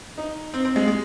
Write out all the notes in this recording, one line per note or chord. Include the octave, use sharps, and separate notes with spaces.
D#4
C4
C4
G#3
G#3